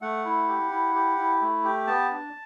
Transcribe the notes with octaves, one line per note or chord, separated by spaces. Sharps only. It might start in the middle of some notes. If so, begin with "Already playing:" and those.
A3 F#5
E4
G4
E4
G4
E4
A3
G4
B3 A5
D4